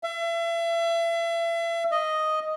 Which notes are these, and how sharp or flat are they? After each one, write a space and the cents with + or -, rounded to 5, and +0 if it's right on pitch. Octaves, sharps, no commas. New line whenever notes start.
E5 +35
D#5 +0